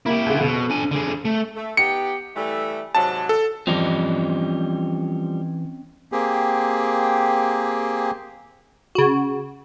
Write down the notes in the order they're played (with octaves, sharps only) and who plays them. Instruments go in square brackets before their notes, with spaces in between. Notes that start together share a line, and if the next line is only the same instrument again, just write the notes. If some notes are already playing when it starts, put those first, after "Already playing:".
[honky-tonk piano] A#3 [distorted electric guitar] E4 G4
[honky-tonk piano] C#2 D3
[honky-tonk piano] F2 [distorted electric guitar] B2
[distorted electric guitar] D4 G#5
D3 G#4
A3
[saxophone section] A3
[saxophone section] B3 D#4 G4 [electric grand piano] C#7
[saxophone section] E3 G3 A3
[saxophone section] G#2 C3 F#3 [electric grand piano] A5
[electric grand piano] A4
[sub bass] E3 [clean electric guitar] F3 G3 [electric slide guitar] C4 C#4 D#5
[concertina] A#3 C4 G4 G#4
[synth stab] C#3 F#4